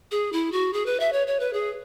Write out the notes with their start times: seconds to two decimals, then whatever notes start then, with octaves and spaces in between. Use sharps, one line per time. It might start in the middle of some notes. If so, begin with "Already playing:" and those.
0.11 G#4
0.33 E4
0.52 F#4
0.73 G#4
0.86 B4
1.00 E5
1.13 C#5
1.27 C#5
1.40 B4
1.53 G#4